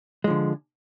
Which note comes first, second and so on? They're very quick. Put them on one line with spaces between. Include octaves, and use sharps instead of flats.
G#3 F3 D3